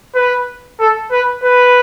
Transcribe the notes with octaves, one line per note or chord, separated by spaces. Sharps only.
B4
A4
B4
B4